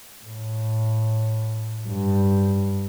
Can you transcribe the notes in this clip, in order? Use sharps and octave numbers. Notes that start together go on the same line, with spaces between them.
A2
G2